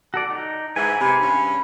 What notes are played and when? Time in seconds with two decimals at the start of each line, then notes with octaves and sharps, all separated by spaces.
0.14 F#4 A4 D5
0.30 D#4
0.76 G#2 E3 G#5
1.01 C3 B5
1.22 G2 C#4